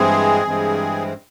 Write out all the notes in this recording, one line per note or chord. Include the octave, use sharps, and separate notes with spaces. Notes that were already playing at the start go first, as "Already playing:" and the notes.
Already playing: G2 E3 G#3 C4 G#4
G2 E3 G#3 C4